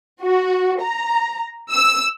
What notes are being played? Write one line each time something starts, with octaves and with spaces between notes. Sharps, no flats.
F#4
A#5
E6